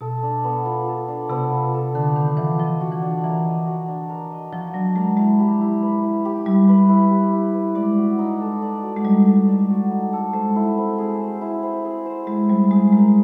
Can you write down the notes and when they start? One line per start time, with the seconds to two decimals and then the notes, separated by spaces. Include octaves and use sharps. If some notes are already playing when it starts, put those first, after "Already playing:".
0.01 B2 A4
0.23 D4
0.44 B3
0.65 F4
0.88 A4
1.08 D4
1.30 C3 B3
1.52 F4
1.74 A4
1.95 D3 D4
2.16 D#3 B3
2.37 E3 F4
2.59 F3 D#5
2.81 F#4
2.92 E3
3.02 D4
3.24 E3 A#4
3.45 D#5
3.67 F#4
3.88 D4
4.09 A#4
4.31 D#5
4.53 F3 F#4
4.74 F#3 D4
4.96 G#3 A#4
5.17 G#3 E4
5.40 G4
5.61 E4
5.82 B4
6.03 E4
6.25 G4
6.46 G3 E4
6.69 B4
6.89 E4
7.11 G4
7.32 E4
7.54 B4
7.75 G#3 D5
7.98 F#4
8.19 D#4
8.41 A4
8.62 D5
8.83 F#4
8.96 G#3
9.05 G3 D#4
9.26 A4
9.48 D5
9.70 F#4
9.91 D#4
10.13 A4
10.33 G#3 C5
10.56 E4
10.78 C4
10.98 G#4
11.20 C5
11.41 E4
11.63 C4
11.84 G#4
12.06 C5
12.27 G#3 E4
12.49 G3 C4
12.71 G#3 G#4
12.92 G#3 A#4